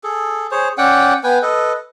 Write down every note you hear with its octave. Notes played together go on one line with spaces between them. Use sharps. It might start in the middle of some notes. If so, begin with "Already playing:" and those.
G#4 A4
G#4 C5 C#5
C#4 D5 F#5 G5
B3 B4 G5 G#5
A4 B4 D#5